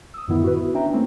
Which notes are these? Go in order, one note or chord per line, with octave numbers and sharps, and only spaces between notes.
D#6 E6
F#2 A2 D3 D#3 B3 E4
F#4 B4
E4
C#4 D4 E5 G5 A#5
A3 A#3 C4 C#4 E4